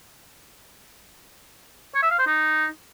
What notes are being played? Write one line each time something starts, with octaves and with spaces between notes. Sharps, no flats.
C#5
E5
F5
C5
D#4